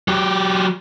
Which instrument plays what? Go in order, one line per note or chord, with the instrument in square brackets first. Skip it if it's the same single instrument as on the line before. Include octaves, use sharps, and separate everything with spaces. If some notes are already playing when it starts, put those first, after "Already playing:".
[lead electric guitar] F#3 G4